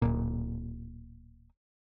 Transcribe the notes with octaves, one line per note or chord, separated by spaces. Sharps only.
D1 A#2